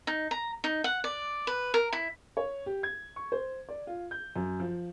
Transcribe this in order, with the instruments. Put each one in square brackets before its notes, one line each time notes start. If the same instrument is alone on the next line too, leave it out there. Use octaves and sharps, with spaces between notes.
[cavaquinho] D#4
A#5
D#4
F#5
D5
B4
A#4
E4
[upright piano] C#5
G4
G#6
C#6
C5
D5
F4
G6
F#2
F3